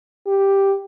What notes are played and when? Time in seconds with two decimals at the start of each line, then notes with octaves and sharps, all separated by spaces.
0.27 G4